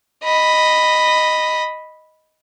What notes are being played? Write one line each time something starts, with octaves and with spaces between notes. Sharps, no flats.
D#5 B5